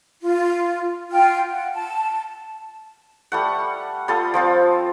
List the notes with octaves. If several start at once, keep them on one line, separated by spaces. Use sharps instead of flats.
F4
F4 G5 F6
F#5
A5
G3 A3 F#5
G3 F4 A4 D#6
F3 C4 F4